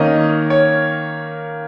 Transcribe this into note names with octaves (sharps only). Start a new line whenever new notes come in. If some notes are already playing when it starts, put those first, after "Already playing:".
Already playing: D#3 A#3 C#4 D#5
C#5